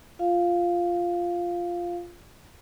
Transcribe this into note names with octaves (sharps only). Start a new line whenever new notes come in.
F4 F5